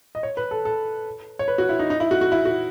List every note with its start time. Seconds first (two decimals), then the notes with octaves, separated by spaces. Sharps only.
0.15 D#5
0.23 C#5
0.37 B4
0.51 A4
0.65 A4
1.39 C#5
1.48 B4
1.58 F#4
1.69 E4
1.79 D#4
1.90 D#4
2.00 E4
2.11 F#4
2.21 F#4
2.32 E4
2.45 F#4